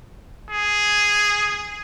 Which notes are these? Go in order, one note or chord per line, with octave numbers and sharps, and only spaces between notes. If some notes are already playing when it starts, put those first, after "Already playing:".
G#4